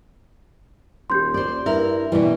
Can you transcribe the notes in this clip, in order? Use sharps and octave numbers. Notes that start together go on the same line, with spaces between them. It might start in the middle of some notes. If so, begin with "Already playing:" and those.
D#1 F4 G4 C6 G6
C5 D5
G2 E4 A#4 E5
B2 E3 G3